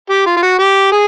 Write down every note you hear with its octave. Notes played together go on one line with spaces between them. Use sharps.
G4
F4
F4
F#4
G4
G#4